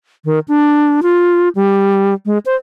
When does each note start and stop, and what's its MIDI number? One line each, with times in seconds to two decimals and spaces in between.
0.25 0.39 51
0.48 1.01 62
1.03 1.49 65
1.55 2.14 55
2.26 2.38 56
2.46 2.56 72